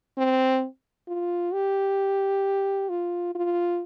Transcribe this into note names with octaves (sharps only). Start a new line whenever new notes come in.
C4
F4
G4
F4
F4